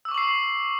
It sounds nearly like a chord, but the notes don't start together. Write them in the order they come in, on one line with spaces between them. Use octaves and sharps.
E6 D6 C#6 F#7 C7